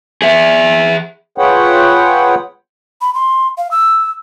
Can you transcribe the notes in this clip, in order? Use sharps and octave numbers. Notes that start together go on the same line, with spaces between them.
G#4 E5
F4 G#4 B4 C#5 F#5 G5
B5
C6
F5
E6